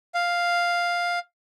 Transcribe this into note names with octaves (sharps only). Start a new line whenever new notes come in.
F5